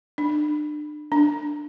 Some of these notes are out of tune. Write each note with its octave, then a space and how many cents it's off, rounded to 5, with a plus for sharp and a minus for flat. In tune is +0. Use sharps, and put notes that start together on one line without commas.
D4 +35
D4 +10